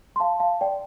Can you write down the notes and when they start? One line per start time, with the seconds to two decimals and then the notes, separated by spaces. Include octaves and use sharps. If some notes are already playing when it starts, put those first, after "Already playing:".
0.16 C6
0.20 F5 A5
0.40 F5 A5
0.61 D5 G5